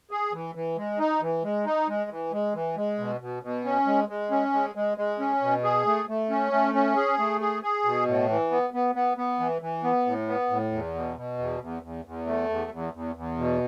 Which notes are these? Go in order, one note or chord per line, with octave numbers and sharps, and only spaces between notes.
G#4
E3
E3
G#3
D#4
E3
G#3
D#4
G#3
E3
G#3
E3
G#3
B2
B2
B2
C#4
G#3
G#3
C#4
G#3
G#3
G#3
C#4
B2
G#4
A3
A3
C#4
A3
C#4
G#4
A3
G#4
G#4
B2
A2
E3
B3
B3
B3
B3
E3
E3
B3
A2
B3
A2
E2
B2
B2
E2
E2
E2
E2
A3
E2
E2
E2
E2
B2